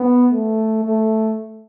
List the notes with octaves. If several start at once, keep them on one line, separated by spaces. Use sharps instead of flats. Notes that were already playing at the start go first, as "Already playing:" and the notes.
Already playing: B3
A3
A3